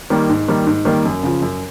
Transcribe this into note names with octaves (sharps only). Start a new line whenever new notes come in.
D#3 G3 A#3
G#2
D#3 G3 A#3
G#2
D#3 G3 A#3
F#2
C#3 F3
F#2